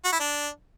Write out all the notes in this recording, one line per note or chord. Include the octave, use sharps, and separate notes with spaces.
F#4
E4
D4